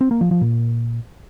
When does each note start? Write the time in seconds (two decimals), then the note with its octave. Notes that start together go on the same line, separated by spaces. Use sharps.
0.01 C4
0.11 A#3
0.21 F3
0.31 F3
0.41 A#2